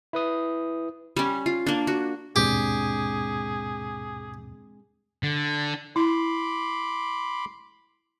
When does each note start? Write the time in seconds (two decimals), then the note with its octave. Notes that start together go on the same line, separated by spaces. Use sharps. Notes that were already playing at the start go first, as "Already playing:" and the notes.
0.13 E4 B4 D#6
1.16 G3 C#4
1.46 F4
1.67 A#3 D4
1.87 F#4
2.36 D#2 G#2 B2 G#3 C4 D4 G4 G#4
5.23 D3
5.96 E4 B5 C6 D6